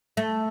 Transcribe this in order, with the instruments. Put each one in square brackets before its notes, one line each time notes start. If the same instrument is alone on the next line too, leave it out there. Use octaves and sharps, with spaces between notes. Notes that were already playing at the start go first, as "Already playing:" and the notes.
[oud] A3